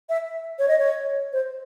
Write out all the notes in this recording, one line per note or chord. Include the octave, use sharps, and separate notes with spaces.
E5
C#5
D#5
C#5
C5